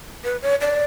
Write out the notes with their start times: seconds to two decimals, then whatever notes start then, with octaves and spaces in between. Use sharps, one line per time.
0.24 B4
0.42 C#5
0.61 D5